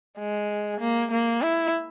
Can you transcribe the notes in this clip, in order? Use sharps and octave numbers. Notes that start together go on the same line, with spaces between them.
G#3
A#3
A#3
E4